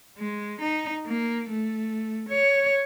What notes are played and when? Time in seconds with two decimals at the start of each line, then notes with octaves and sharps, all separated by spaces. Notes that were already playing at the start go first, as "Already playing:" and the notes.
0.18 G#3
0.61 D#4
1.06 A#3
1.49 A3
2.29 C#5